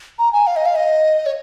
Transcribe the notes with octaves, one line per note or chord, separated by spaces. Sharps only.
A#5
G#5
F5
D#5
F5
D#5
C#5